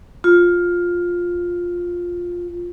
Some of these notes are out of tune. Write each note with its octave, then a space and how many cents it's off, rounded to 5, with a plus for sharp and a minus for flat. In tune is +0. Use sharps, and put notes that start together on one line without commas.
F4 +10